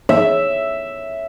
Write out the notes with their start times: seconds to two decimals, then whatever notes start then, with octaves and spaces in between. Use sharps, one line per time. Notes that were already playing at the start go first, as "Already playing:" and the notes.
0.09 E5